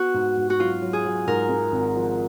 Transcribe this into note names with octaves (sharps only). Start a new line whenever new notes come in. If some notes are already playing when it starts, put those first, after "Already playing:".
Already playing: B3 F#4
G#2
G#2
F#4
F#3 F4
F#3
G#4
F#3
G#2 A#4
G#3
G#1
F3